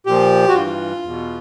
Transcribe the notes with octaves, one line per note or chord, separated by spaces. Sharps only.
A#2 F3 G4
F#4
G2 E3 F4
E2 B2